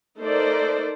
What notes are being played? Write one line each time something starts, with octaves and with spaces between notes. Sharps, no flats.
A3 D#4 A4 A#4 C5 D5